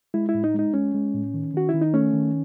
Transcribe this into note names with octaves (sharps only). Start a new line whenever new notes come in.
G#3 E4
E4
A2
D#4
G#3 D#4
G#3 C#4
G#3
A2
D#3
D#3 F#4
E4
D#3
D#4
A3 C#4
D#3